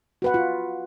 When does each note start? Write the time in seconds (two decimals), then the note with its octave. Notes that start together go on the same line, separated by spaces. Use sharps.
0.22 F#4 B4 F#5
0.34 F4